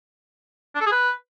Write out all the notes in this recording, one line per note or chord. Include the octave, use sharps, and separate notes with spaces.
D4
A4
G#4
B4